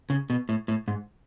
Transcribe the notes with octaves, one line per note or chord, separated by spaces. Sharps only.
C#3
B2
A2
A2
G#2